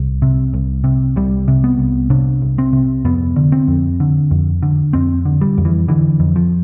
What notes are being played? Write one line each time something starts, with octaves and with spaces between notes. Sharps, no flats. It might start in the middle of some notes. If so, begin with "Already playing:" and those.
Already playing: C2
C3
C2
C3
C2 G3
C3
B3
C2
C3 D4
C2
C4
C3
F2 B3
D3
C4
F2
D3
F2
D3
F2 C4
D3
G3
F2
E3
D3 E3
F2
F3